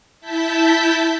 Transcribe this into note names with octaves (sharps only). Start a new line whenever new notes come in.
E4 A5 G6 B6